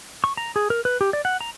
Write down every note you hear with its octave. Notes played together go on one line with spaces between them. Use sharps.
C#6
A#5
G#4
A#4
B4
G4
D5
F#5
A#5